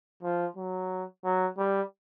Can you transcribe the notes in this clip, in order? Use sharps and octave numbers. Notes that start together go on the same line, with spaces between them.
F3
F#3
F#3
G3